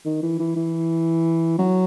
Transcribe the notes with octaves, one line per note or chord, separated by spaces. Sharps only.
D#3
E3
E3
E3
F#3